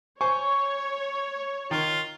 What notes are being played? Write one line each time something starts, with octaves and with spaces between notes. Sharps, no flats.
C5 C#5 G#5 C#6
D#3 F4